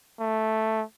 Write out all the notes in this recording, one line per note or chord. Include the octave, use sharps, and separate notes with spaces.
A3